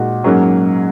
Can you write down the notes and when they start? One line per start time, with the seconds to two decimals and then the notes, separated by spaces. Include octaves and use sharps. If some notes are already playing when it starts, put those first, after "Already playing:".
Already playing: A#2 G#3 D#4 F#4
0.24 G#2 F#3 A#3 C#4